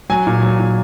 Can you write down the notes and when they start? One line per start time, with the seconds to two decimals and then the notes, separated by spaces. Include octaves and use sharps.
0.09 F#3 G#5
0.27 A#2
0.42 F#3
0.59 A#2